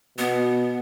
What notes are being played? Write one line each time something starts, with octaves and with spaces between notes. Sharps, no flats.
B2 B3